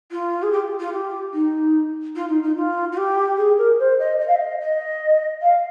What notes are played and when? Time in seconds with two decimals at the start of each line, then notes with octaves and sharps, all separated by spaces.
0.11 F4
0.43 G#4
0.52 G4
0.80 F4
0.93 G4
1.34 D#4
2.16 F4
2.29 D#4
2.43 D#4
2.56 F4
2.92 F4
2.97 G4
3.37 G#4
3.58 A#4
3.79 C5
3.99 D#5
4.20 D#5
4.28 F5
4.36 D#5
4.61 D#5
5.42 F5